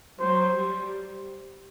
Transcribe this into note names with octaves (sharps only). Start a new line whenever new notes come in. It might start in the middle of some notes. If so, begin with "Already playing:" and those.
F#3 C5
G3